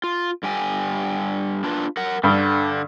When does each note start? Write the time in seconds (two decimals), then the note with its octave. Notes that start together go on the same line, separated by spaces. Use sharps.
0.04 F4
0.43 G2 G4 G#5
1.64 D4 F4 B4
1.97 A#4 F#5
2.24 G2 D3